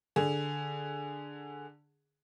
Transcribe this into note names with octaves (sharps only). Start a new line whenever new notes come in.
D3 G#4